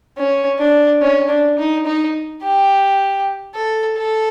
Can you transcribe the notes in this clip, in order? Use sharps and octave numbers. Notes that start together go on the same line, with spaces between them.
C#4
D4
C#4
D4
D#4
D#4
G4
A4
A4